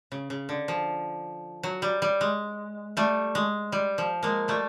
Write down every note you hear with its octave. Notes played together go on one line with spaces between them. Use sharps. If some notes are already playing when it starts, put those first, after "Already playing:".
C#3
C#3
D3
F3
F#3
G3
G3
G#3
G3 A3
G#3
G3
F3
G#3 A#3
G3 A3